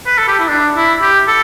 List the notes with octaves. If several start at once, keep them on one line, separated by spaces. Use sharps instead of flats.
B4
A4
G4
E4
D4
E4
G4
A4